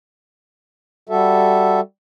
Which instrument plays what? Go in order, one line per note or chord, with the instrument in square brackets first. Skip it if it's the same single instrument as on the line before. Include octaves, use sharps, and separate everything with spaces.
[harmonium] G3 F#4 A4 E5